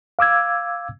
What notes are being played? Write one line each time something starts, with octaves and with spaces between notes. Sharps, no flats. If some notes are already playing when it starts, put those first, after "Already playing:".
F5 D6 E6 G#6